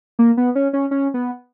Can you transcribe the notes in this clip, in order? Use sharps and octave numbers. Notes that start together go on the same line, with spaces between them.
A#3
B3
C#4
C#4
C#4
B3